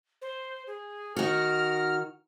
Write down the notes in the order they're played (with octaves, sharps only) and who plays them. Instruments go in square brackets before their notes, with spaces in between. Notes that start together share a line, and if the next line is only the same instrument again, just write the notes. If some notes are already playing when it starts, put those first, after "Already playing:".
[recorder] C5
G#4
[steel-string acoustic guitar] D#3 F#4 [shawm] A#4 [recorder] F6